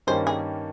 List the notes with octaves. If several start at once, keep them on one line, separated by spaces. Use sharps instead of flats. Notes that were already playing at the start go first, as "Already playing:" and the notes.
G2 D#3 G3 A#3 C#4 C5
G#4